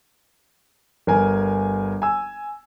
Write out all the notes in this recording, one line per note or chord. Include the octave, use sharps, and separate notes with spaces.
G1 A#4 G#5
G#5 E6